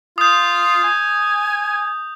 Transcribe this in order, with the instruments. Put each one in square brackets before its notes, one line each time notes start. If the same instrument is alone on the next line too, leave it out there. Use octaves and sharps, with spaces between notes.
[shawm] F4 [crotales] D#6 G6
[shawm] G#5